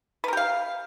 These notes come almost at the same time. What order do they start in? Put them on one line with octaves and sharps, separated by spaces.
B4 A#4 G4 F5